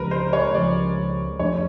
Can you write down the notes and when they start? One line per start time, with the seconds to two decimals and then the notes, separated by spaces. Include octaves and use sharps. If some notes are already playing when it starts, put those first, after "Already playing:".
Already playing: C#2 C#3 F3 G#3 A#4 B4
0.11 C5
0.33 C#5
0.54 C#2 C#3 F3 G#3 D5
1.39 F2 C3 F3 A3 D4 C#5